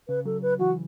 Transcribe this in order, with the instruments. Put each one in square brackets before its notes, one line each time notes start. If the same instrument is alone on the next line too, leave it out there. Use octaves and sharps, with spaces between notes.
[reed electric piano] C#3 [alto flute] B4
[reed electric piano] F#3 [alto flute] A4
[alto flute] B4
[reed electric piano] E3 [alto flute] F#4